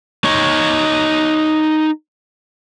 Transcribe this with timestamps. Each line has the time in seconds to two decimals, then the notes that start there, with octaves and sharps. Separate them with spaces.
0.25 D#4 C#5